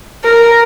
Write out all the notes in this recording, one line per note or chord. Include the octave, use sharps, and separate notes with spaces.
A#4